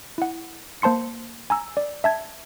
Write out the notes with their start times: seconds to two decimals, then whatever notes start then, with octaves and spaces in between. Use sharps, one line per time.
0.18 E4 F#5
0.82 A#3 C5 A5 C6 C#7
1.50 G#5 A#5 E6
1.77 D5
2.04 E5 A5 G#6